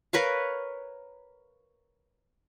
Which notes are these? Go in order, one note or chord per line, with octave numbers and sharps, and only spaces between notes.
A#4 B4 C#5 F5